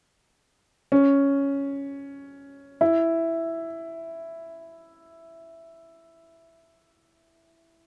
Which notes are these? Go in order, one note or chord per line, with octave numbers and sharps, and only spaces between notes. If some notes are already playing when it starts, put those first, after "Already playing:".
C#4
E4